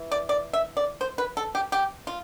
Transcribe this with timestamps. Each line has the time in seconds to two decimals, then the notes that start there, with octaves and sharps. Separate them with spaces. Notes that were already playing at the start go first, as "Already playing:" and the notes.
Already playing: E3
0.12 D5
0.29 D5
0.53 E5
0.77 D5
1.01 C5
1.18 B4
1.37 A4
1.55 G4
1.72 G4
2.07 F4